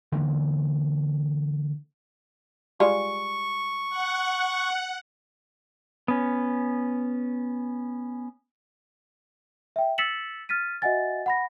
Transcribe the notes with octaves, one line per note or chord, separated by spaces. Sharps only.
D3 E3 A#3
G3 G#3 F4 C#6
F#5
B3 C#4
E5 G5
E6 A6 B6 C#7 E7 F#7
F6 A6 B6 D#7
F#4 D#5 E5 F#5 G#5 A6
F#5 B5 A#6